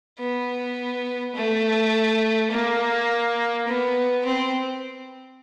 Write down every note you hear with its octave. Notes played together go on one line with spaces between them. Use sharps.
B3
A3
A#3
B3
C4